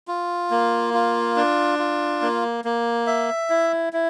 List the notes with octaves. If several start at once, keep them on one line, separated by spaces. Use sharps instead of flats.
F4
A#3
F4
D4
F4
A#3
A#3
E5
E4
E4